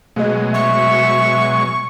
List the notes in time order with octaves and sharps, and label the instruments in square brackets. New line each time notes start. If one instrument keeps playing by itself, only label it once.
[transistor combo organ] B2 F#3 G#3 [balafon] A3 G#4 D#5
[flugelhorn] E5 [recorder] C#6